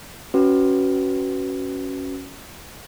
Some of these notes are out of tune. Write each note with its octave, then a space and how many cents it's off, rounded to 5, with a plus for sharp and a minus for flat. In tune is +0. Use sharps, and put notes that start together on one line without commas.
C#4 +0 F#4 +15 B4 +5